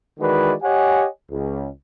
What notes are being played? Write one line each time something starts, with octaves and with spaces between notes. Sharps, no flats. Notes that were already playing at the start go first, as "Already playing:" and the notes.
D#3 E3 G#3 F#4 B4 D5
G4 C#5 D#5 F#5 G#5
C#2